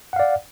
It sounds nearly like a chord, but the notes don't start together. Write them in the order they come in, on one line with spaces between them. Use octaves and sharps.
F#5 F5 D5